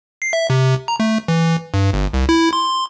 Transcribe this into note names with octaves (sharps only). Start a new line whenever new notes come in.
C7
E5
C3
A#5
A3
E3
G2
G1
C2
E4
C6